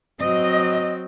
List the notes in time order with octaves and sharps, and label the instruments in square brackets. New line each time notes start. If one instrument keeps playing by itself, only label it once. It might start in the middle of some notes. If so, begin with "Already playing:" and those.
[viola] F#3 C4 [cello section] D#5